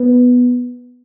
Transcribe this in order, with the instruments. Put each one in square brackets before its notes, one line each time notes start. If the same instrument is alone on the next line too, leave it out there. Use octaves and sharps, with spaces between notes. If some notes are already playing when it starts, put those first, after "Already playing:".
Already playing: [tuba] B3